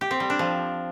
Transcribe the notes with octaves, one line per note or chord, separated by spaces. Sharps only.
G4
C4
G3
D4
F3